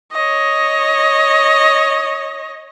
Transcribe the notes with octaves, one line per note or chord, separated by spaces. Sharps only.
C#5 D#5